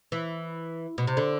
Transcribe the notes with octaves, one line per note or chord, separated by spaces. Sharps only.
E3
B2
C3
D3